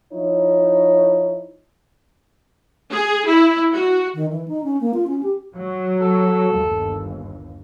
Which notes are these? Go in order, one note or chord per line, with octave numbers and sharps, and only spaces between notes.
F3 D#4 E4 C#5
G#4
E4
F#4
D#3
E3
D#4
C#4
A#3
F4
C#4
G4
F#3
A4
G1 D#2